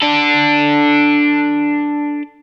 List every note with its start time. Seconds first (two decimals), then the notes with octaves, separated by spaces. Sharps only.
0.02 D4 A4